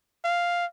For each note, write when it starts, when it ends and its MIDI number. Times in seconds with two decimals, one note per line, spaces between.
0.24 0.66 77